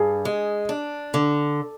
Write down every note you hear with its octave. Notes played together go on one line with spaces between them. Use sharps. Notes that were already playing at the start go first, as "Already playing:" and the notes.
Already playing: G2 G#4
G#3
D4
D3